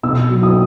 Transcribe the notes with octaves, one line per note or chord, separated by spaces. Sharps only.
B2 E6
F#3
D#6